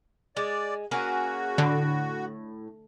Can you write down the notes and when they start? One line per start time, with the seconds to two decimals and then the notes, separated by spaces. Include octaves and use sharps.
0.37 G#3 D5
0.91 A#3 C#4 F#4 G#4
1.58 A2 D3